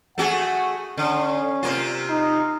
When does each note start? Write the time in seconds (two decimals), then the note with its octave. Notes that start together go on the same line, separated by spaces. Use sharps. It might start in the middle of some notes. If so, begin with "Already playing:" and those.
0.18 A3 F#4 G#4 F#5
0.97 D3 C#4
1.63 C3 A#3 F4
2.09 D#4